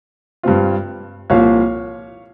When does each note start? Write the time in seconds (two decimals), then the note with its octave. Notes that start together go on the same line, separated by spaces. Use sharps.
0.43 G2 G3 C4 F4
1.30 C2 A#2 F3 A#3 F4 C#5 F5